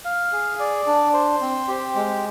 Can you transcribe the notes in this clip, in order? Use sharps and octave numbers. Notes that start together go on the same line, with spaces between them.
F5
G#4
D5
D4
C5
C4
G4
G#3